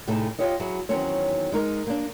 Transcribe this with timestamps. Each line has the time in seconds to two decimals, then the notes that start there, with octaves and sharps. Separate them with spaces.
0.07 A2 C3 A3 D#4 G#4 A4
0.39 F4 G4 C#5 D#5
0.60 F#3 E4 F#4 G#4
0.89 E2 D#3 F#3 C4 C#4 C#5
1.52 G#3 D#4 A#4
1.87 A#3 D4